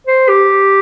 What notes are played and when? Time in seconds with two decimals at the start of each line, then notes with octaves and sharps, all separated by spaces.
0.07 C5
0.29 G4